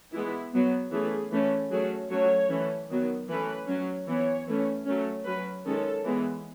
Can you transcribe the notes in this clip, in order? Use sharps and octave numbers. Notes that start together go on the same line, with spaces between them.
E3 G#3 B3 E4
F#3 B3
E3 A3 C#4 G#4
E3 A3 C#4
F#3 A3 C#4 G#4
F#3 A3 C#4 C#5
E3 A3 C#4
D#3 F#3 B3
E3 A3 C#4 B4
F#3 C#4
E3 B3 C#5
E3 A3 C#4
F#3 A3 C#4
F#3 C#4 B4
D#3 G#3 C#4 A4
E3 G#3 B3